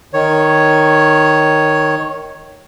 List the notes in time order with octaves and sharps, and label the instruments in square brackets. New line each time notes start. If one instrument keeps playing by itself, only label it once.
[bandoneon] D#3 C#5